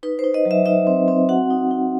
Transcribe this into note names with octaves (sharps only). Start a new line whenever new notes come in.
D#4 B4
C5
D#4
D#5
F#3
E5
D#4 E5
C4
C4
F#4 F#5
D#4
D#4